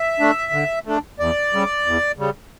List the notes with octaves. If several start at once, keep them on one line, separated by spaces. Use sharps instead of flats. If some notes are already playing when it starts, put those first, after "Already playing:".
Already playing: E5
A3 D4
D3
A3 D4
E2 D5
C#3 G3
E2
C#3 G3